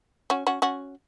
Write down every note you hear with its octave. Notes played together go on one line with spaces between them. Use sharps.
C#4 F#4
C#4 F#4
C#4 F#4